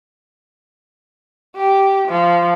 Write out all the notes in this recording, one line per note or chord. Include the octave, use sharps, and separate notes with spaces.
G4
F3